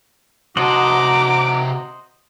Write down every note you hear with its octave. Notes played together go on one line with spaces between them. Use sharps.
C3 F#4 C5 D#5 F#5 A5 A#5 D6